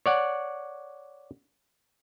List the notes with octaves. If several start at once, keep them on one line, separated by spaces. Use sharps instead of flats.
C#5 D5 F#5